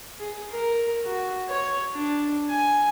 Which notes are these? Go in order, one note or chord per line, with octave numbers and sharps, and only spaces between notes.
G#4
A#4
F#4
C#5
D4
G#5